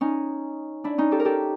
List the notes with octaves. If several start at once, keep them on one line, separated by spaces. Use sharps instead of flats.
C#4 D#4
D4 E4
C#4 D#4
G4 A4
A#4
G4 A4